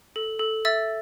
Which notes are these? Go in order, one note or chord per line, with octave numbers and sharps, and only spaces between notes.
A4
A4
E5 E6 A6